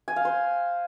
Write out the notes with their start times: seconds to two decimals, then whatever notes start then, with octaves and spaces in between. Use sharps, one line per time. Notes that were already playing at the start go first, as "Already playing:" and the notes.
0.08 G#5
0.16 F5
0.25 C5